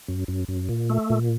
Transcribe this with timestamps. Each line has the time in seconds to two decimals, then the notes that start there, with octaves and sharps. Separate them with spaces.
0.08 F#2
0.28 F#2
0.48 F#2
0.69 A#2
0.90 A3
1.10 A#2